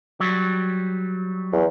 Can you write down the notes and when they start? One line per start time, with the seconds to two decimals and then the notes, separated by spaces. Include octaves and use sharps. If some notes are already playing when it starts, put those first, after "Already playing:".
0.20 F#3 G3
1.53 E2